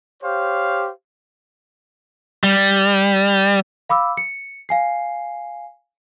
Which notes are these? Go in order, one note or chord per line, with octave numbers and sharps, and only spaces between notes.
G4 C5 C#5 F5
G3
F5 B5 D6 E6
C#7
F5 G#5 C7